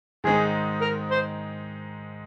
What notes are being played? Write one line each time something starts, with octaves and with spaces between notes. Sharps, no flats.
G#2 D#3 G#3 C4 D#4 G#4
A#4
C5